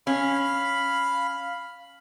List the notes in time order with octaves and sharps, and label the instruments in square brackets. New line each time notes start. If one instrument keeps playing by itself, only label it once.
[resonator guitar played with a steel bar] C#4 [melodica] F5 B5